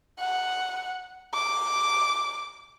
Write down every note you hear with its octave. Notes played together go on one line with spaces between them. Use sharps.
F#5
D6